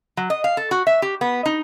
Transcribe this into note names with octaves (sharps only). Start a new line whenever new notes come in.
F#3
D#5
F5
A4
F#4
E5
G4
B3
D#4